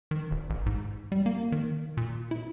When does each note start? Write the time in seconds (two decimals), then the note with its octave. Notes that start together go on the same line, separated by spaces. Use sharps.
0.11 D#3
0.31 D#1
0.50 A1
0.66 G#2
1.12 G3
1.26 A#3
1.52 D#3
1.97 A#2
2.31 E4